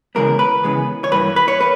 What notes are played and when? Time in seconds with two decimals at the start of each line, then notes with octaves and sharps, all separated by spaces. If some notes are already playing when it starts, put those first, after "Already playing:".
0.15 C#3 E3 G#3 B3 A#4
0.39 B4
0.63 C#3 E3 G#3 B3
1.04 C#5
1.12 G2 E3 A#3 B4
1.36 B4
1.48 C#5
1.60 A#3 B4